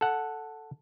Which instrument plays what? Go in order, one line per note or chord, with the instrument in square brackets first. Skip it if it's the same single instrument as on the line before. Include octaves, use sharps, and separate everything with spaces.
[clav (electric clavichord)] A4 F#5